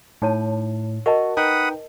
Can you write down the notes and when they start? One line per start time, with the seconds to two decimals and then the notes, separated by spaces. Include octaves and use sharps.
0.22 A2 D#4 C#5 A5
1.06 F#4 A#4 D#5 A5
1.37 D#4 B4 F#5 G5 B5 D#6